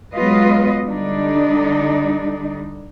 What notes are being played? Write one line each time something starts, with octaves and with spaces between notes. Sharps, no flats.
F#3 G#3 B3 F4 B4 D#5
D3 G3 D4 D#4